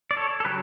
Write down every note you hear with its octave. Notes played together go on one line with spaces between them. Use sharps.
D5
A4 C#5
A4
C#3 F#3 G4 B4